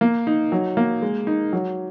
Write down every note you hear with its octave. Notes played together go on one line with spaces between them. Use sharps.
A#3
D#4
F#3
A#3
G#3
D#4
F#3